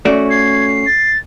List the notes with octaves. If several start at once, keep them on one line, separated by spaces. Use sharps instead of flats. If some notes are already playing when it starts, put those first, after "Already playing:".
A3 C#4 F#4 D5
G#6 C7
A6